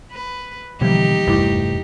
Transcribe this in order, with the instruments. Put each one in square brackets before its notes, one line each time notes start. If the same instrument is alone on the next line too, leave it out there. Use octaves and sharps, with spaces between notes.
[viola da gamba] B4
[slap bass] B2 D3 A#3 [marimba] E3 F3 G3 [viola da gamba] D#4 G4
[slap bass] F1 G2 A3 [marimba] E2 E4 D6